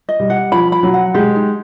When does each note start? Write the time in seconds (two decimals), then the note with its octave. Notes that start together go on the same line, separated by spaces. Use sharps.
0.09 D#5
0.20 G3
0.30 F#5
0.52 F3 B5
0.72 B5
0.83 F#3
0.94 F#5
1.14 G#3 G4
1.35 D#4